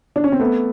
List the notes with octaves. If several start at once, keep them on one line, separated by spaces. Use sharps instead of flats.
D4
C#4
C4
A3 B3